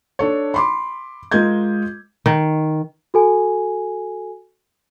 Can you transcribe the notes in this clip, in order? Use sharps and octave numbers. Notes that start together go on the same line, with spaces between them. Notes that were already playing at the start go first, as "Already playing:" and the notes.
D4 A4 C#5
B5 C6 D6
G#3 F4 A#4 D#5 G6 G#6
D#3
F#4 A4 G#5